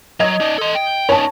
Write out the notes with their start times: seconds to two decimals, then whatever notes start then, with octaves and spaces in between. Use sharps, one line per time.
0.20 F#3 D#5 G#6
0.40 D#4 D5
0.58 A4 C6
0.75 G5
1.09 C#4 D#4 C#5 A5